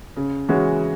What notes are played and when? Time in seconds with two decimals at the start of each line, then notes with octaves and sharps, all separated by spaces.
0.16 C#3
0.49 E3 G#3 C#4 F#4